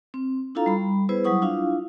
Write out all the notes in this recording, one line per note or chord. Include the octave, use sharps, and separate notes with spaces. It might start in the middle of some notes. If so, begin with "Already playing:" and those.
C4
D4 E4 F4 A4 F5 A#5
G3 B5
B3 E4 G#4 B4 C5
F#3 G3 E4 F#5 C#6 D#6
D4 E4 F4 F5